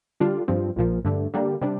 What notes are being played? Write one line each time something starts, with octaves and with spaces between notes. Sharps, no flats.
D3 G3 D4 F4
G2 F3 C4
A#1 A#2 F3
G2 D3 A3
D3 G3 A#3 D4
C3 G3 D4